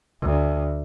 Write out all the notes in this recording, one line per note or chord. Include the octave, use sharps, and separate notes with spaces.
D2